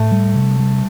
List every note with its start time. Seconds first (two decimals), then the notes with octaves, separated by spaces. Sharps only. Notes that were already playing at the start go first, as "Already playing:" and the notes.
Already playing: A2 A3
0.12 G3
0.35 C3
0.59 G3